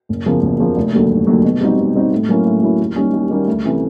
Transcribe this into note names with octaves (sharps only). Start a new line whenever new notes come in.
F#1
E2 C#3 F3 A#3
F#1
E2 C#3 F3 A#3
F1
D#2 D3 F#3
F1
D#2 D3 F#3
B2
G3 C4 D#4 F#4
B2
G3 C4 D#4 F#4
A2
F#3 A#3 C#4 E4
A2
F#3 A#3 C#4 E4
D#2
D#3 G3 A#3 C#4
D#2
D#3 G3 A#3 C#4
D2
C3 E3 A3 C#4